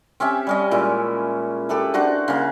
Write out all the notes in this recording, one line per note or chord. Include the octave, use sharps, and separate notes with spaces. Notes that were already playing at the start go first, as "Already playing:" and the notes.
C4 C#4 G4 E5
G3 C#4 D#5
A#2 G#3 E4
G4 A4 B4 E5
D4 F#4 C5
C#3 A#3